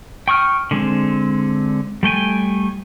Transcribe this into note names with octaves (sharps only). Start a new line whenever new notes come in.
G5 C#6 D#6 F6
D3 G#3 C4
G3 A3 G5 G#5